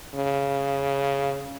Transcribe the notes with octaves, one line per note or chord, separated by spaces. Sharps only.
C#3